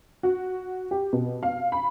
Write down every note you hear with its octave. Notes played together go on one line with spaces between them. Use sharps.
F#4
G4
B2
F5
B5